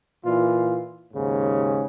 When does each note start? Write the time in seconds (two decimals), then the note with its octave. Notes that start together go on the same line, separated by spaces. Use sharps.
0.23 A#2 E3 F4
1.12 D#2 G#2 C#3